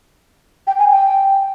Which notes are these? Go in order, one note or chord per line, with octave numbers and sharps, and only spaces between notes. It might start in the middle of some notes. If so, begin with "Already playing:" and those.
G5
G#5
G5